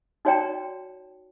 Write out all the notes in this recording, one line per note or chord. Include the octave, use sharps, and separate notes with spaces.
D#4 F#4 C#5 D5 G5 A#5